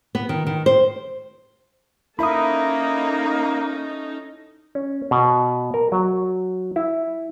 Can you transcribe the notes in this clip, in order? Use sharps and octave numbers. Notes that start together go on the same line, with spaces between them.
B3
D#3
D#3
C5
A#3 C#4 D#4 E4 A4 E5 B5 D#6
C#4
B2
A#4
F#3
E4